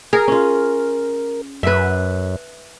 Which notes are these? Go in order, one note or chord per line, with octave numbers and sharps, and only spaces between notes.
G#4 A#4
C#4 F4
F#2 B4 E5